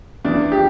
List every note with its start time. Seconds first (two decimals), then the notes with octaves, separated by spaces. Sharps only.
0.25 E2 D4
0.52 G4